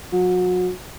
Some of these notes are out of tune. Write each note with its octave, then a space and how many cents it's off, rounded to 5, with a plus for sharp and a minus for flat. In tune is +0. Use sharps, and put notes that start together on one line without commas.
F#3 -35